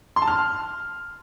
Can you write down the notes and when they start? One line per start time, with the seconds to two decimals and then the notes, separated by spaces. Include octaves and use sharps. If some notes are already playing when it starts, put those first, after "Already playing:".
0.16 C6
0.22 A5
0.28 F6